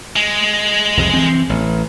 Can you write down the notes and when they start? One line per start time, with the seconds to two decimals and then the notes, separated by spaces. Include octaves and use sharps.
0.16 G#3
0.97 C2 F2
1.14 E3 C4
1.50 A1